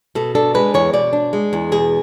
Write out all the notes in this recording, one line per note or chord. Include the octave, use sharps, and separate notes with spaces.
B2 A4
D4 A4
G#3 B4
E2 C#5
B2 D5
D4
G#3
E2
B2 G#4